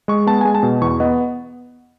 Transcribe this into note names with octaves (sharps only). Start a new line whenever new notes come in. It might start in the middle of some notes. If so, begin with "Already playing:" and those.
G#3 C#6
B3 A5
G#3 G#5
A5
B2
E2 C#6
B3 D#5